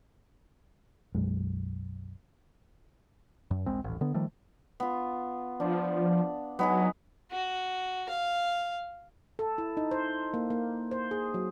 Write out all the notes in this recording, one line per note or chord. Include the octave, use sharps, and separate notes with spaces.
B1 F#2 G#3
F#2
D#1 A#1 G#3 C4
D#1 A1
D3 B3
D#3 F3 G3 A3
B3 F4
F3 D4
F#3 B3 D#4 G#4
F#4
F5
A4
E4
D#4
C5
A#3
A#3
C5
G#4
F#3